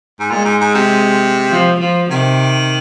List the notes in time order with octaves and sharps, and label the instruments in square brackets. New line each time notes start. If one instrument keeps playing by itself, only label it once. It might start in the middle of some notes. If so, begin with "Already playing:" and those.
[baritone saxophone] G#2
[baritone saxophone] A#2 [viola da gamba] G#3
[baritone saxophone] G#2
G#2
C3
[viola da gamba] F3
F3
[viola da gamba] C3 [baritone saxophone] D#3